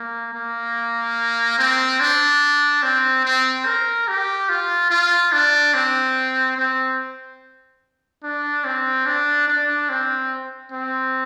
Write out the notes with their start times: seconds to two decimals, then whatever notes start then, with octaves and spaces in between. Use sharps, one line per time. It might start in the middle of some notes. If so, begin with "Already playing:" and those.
Already playing: A#3
0.33 A#3
1.58 C4
2.00 D4
2.83 C4
3.25 C4
3.66 A#4
4.08 G4
4.49 F4
4.90 F4
5.32 D4
5.74 C4
6.57 C4
8.23 D4
8.65 C4
9.06 D4
9.48 D4
9.89 C4
10.72 C4